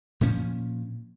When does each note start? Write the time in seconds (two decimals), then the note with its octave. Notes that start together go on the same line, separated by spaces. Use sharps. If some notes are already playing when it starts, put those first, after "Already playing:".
0.21 A#2 F3 C#4